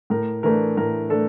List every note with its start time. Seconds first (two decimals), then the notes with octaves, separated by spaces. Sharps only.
0.10 A2 A#4
0.43 E3 A3 D4 A#4
0.77 A2 A#4
1.10 E3 A3 D4 A4